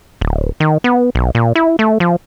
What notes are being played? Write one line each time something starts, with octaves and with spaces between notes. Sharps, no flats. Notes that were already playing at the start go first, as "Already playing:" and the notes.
D1
D#3
B3
B1
A#2
E4
A3
F3